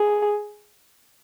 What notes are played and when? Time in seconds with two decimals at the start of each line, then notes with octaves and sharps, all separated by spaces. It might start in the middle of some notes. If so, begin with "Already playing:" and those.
Already playing: G#4